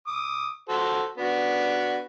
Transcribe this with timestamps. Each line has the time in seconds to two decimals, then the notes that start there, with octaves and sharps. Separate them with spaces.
0.07 D6 D#6
0.69 F#4 A4 C5
1.17 B3 D4 F#4